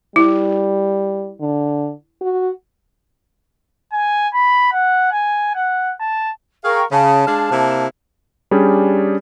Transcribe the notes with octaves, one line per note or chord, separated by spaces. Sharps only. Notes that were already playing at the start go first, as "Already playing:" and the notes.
G3 E4
D3
F#4
G#5
B5
F#5
G#5
F#5
A5
G#4 A#4 F5 G5 C#6
C#3 A5
G#3 D4 F5
C3 A#3 E4
G3 C#4 D4 G4 G#4